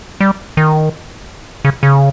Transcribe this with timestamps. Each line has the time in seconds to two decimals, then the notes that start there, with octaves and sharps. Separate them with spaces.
0.20 G3
0.57 D#3
1.65 C#3
1.83 C#3